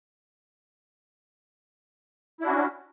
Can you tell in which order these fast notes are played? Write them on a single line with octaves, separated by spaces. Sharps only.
E4 D4 F#4 C#4